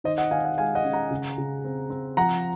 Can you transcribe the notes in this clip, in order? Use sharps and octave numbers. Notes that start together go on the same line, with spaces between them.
D#3 C5 D#5
D#5 F#5
D#3 F5 G#5
D#5 F#5
G#3 F5 G#5
D#5 F#5
C#4
F#5 A#5
C#3
C#3
C4
C4
F3 F#5 A#5